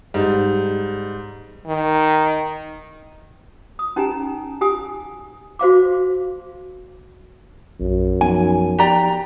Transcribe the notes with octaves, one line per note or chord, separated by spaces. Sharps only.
G#2 G3
D#3
D#6
C#4 D#4 G4 G#5 A#5
G4 G#5 D#6
F#4 C5 F5 D6
A#1 F#2
F3 B3 D#4 G#5
G4 D5 A#5